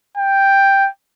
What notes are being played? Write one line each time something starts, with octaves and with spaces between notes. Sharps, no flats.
G5